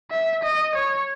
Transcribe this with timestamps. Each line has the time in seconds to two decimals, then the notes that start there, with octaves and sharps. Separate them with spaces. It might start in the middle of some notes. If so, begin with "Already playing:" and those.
0.11 E5
0.44 D#5
0.76 C#5